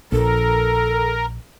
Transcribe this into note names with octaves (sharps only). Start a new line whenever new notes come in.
A#1 A4 A#4